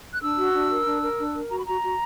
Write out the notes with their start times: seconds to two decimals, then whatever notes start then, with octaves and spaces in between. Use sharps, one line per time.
0.14 F#6
0.22 D4 E6
0.38 F#4
0.54 D4
0.70 A#4
0.86 D4
1.02 A#4
1.18 D4
1.34 A#4
1.50 F#4 A#5
1.58 B5
1.66 F#4 A#5
1.83 F#4